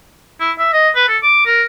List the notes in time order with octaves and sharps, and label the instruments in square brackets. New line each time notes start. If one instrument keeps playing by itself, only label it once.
[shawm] E4
E5
D#5
B4
A4
D6
A#4